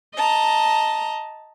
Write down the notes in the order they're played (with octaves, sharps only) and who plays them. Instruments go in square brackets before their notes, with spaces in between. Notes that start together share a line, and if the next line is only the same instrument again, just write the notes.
[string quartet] D#5 A5 A#5